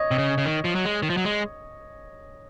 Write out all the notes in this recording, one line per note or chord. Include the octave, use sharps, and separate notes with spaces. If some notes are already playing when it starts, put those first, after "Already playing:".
Already playing: C#5 D#5
C3
C#3
C#3
D#3
F3
F#3
G#3
D#3
F3
F#3
G#3